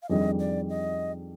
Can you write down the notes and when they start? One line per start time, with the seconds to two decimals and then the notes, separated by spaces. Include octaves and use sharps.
0.03 F5
0.09 F2 D#3 G3 D4 G#4 D#5
0.40 D5
0.70 D#5